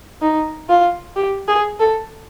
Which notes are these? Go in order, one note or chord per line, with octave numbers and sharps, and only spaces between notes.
D#4
F4
G4
G#4
A4